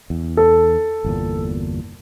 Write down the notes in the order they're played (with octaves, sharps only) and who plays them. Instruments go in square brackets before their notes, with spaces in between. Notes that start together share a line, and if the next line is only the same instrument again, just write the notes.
[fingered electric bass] E2
[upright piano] A4
[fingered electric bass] G1 E2 A#2